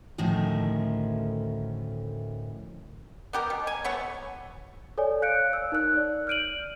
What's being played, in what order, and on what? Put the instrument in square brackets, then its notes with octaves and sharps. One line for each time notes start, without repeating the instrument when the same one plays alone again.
[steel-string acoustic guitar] D2 A2 D#3 F3 C#4
[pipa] B3 G4 A#4
B2
G#5
A3 B3 C#5
[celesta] A4 C#5 D5 G#5
F5 F#6 G6 C#7 D7
C#5 E6
D#4 A#4 F#6
D5
F6 G6 D7 D#7 F#7